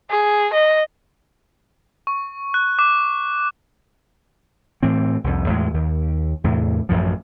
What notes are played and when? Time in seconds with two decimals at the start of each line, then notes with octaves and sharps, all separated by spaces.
0.10 G#4
0.53 D#5
2.07 C#6
2.54 F#6
2.79 D6
4.83 A2 E3 C4
5.24 C2 F2
5.48 E2 A2 G#3
5.74 D#2
6.44 E2 A2 C3
6.89 A1 F#2 A2 F3